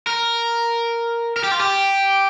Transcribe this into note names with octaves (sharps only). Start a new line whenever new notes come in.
A#4
A#4
G4
F4
G4